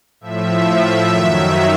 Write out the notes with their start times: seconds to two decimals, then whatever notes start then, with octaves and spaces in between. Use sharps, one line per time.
0.21 A2 F3 E5
0.64 E5
1.07 F#2 D#3 F#3